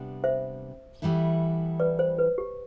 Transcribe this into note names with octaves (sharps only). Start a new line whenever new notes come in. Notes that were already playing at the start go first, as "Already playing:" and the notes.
Already playing: C3 G3 B3 D4
C5 E5
E3 G3 B3 E4 A4
B4 D5
C5
B4
G4